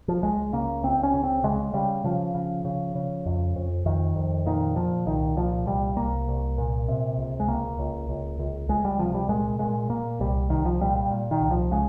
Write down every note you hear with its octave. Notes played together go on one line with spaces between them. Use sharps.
F3
C#2 G#3
C#3 A#3
C#2 C4
C#4
C#3
C4
C#3 G#3
C#3 G3
C#3 F3
C#3
C#3
C#3
F2
F2
F2 D#3
F2
A#2 D#3
A#2 F3
C2 D#3
A#2 F3
C2 G3
C2 A#3
C2
A#2
C3
C#2
G#3
C#2 A#3
C#2
C#2
C#2
C#2 G#3
G3
C3 F3
G3
A#2 G#3
A#2 G#3
A#2 A#3
C2 G3
C2 D#3
F3
A#2 G3
G3
A#2
D#3
C2
F3
C#3 G#3